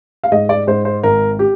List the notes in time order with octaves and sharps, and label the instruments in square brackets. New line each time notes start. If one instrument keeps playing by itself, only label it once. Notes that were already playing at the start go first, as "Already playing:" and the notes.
[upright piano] F5
G#2 D#5
D5
G#2 C5
C5
G#1 A#4
G4